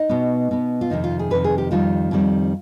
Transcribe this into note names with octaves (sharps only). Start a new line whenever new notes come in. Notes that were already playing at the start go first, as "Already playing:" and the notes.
Already playing: D#4
B2 B3
B2 B3
F4
F2 C3 D#3 D#4
F4
G#4
F2 C3 D#3 B4
G#4
G4
F2 D#3 G3 C4 F4
F2 D#3 G3 C4